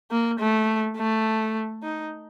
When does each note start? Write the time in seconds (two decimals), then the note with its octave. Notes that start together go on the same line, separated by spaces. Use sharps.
0.11 A#3
0.39 A3
0.97 A3
1.83 D#4